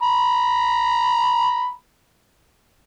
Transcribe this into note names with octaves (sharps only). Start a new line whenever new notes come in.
A#5 B5